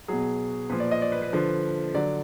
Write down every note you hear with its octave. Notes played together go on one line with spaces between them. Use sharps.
B2 F#3 G#4
A#2 F3 B4
D5
D#5
D5
B4
B4
D3 F3
D3 F#3 D5